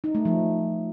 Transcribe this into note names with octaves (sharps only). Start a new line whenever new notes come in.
D#4
A3
F3